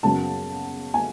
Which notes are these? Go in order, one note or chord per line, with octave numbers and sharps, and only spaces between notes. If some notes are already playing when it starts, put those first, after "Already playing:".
F#2 C#3 F#3 B3 A5
G#5